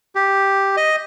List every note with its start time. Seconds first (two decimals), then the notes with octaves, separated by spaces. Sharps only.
0.15 G4
0.77 D#5